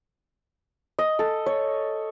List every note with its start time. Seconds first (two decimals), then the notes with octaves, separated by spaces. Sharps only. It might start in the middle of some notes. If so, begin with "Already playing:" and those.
0.99 D#5
1.19 A4
1.46 C#5